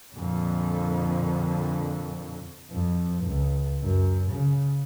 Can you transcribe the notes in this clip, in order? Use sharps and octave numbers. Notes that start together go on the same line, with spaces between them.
F2 A#2 D3
F2
C#2
F#2
C#3